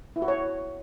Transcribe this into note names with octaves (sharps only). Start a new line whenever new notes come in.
E4
F#4
C#5